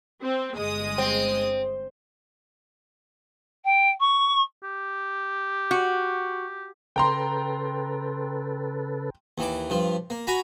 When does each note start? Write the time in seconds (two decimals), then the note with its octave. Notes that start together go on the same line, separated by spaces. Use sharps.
0.22 C4
0.56 G1 G#3 D#6
0.98 C4
3.64 G5
4.00 C#6
4.63 G4
5.71 F#4
6.96 C#3 A4 B4 G5 A#5 C6
9.38 D#2 E3 D6
9.70 G2 F3
10.10 A#3
10.27 F#4 G#5 A#5 B5